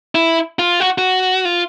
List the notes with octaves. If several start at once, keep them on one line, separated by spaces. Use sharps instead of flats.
E4
F4
F#4
F#4
F4